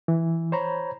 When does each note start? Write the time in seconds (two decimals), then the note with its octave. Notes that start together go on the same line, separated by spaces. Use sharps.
0.08 E3
0.52 C5 C#5 A#5 B5